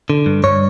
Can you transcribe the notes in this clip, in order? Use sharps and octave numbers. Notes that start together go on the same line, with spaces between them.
D3
G2
G2 C#5